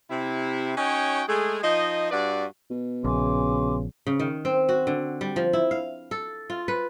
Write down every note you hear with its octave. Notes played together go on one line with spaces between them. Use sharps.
C3 E4
C#4 D#4 F#4 C#5 G5
G#3 A3 G#4
F3 D#4 D#5
G2 F#4 B4 D5
B2
A#1 C#3 G#5 C6 D6
C#3
D#3
C4
F#4
D3
G3
F3
E4
F5
A4
F4
B4